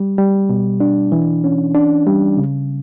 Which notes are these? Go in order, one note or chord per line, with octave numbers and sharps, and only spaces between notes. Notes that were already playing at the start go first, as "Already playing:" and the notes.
Already playing: G3
G3
B2
D4
E3
C#4
D4
G3
C#3